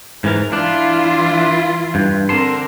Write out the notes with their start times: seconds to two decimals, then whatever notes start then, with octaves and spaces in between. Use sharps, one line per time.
0.24 G#2 E3 A#4
0.53 E3 D4 E4 F4
1.95 G2
2.29 D3 C4 A#4 A5 C6